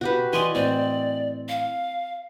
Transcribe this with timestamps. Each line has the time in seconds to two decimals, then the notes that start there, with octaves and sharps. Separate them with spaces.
0.01 B2 F#4 G4 B4
0.33 E3 D5 D#5 G#5 C6
0.55 A2 E3 C4 D5
1.49 F5